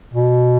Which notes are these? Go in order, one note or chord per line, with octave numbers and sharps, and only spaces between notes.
B2